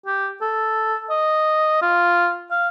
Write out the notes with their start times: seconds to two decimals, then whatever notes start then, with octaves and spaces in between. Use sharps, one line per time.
0.06 G4
0.41 A4
1.10 D#5
1.82 F4
2.51 F5